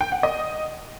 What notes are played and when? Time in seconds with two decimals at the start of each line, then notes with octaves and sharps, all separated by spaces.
0.01 G5
0.12 F#5
0.23 D#5